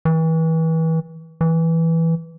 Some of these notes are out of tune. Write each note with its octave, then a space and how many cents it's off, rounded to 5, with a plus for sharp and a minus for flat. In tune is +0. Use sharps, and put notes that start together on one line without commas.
E3 -30
E3 -5